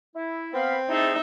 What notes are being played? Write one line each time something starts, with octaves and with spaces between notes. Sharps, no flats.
E4
B3 C4 F5 B5
D#4 E4 G#4 A4 E5